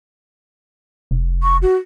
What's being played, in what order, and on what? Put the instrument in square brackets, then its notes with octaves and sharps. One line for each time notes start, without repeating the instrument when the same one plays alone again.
[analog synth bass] F1
[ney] C#6
F#4